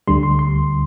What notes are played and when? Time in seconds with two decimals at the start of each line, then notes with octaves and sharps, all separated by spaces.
0.08 D2 D3 G3 C6
0.23 C6
0.39 C6